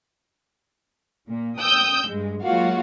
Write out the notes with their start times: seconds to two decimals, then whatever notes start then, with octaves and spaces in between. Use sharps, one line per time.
1.27 A#2 A#3
1.58 G5 D#6 E6 G6
2.07 G2 G#3
2.42 F#3 G#3 A#3 F4 F#4 F5